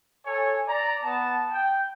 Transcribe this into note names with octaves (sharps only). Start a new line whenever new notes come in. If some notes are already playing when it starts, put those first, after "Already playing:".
A4 C#5 G#5
D5 A#5
B3 A5
G5